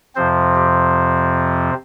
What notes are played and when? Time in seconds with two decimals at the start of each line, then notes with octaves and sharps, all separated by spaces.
0.15 F2 C3 F3 C4 C5
0.55 G4